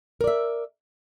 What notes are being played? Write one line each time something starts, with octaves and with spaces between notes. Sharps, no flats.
A#4 D5 E5